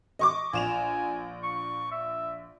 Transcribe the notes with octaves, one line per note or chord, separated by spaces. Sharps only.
D#5 C#6 D6
A#1 G#5 E7 F7
C#6
E5